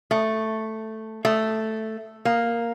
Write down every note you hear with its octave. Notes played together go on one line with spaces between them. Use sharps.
A3
A3
A#3